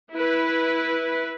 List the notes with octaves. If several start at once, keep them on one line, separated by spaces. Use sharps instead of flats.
E4 B4